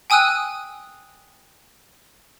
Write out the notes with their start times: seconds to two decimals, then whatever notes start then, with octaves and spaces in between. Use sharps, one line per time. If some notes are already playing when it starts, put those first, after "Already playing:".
0.10 G5 G#5 D#6 E6 F#6 D#7